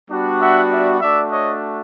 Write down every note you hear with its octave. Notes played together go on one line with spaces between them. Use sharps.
G3 B3 D4 F#4
E5 F#5
D5 E5
A3 D4 F#4 D5 E5
C#5 D#5